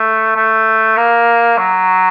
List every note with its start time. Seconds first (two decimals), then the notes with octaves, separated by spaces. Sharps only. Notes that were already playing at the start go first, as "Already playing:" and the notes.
Already playing: A3
0.36 A3
0.97 A#3
1.58 F#3